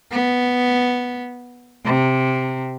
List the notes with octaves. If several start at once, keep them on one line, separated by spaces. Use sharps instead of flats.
B3
C3